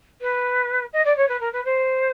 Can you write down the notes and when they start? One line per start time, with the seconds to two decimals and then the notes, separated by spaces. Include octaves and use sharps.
0.21 B4
0.93 D#5
1.05 D5
1.16 C#5
1.28 B4
1.40 A#4
1.52 B4
1.65 C5